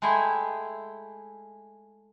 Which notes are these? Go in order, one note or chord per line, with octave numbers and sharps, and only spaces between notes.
G#3 A3 E4 G#4 G5